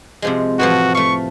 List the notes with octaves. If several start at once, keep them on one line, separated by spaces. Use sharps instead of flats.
C3 F3 G#3
A2 E3 F3 F#4
A3 F5 C#6